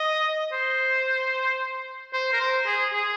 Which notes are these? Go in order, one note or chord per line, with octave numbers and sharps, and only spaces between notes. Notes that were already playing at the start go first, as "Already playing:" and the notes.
Already playing: D#5
C5
C5
A#4
C5
G#4
G#4